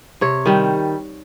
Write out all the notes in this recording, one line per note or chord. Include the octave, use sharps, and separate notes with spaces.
C3 C#5
D#3 G3